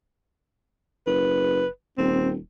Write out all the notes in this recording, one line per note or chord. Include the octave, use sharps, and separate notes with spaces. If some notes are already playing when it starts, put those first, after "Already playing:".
F#1 B4
D#1 C4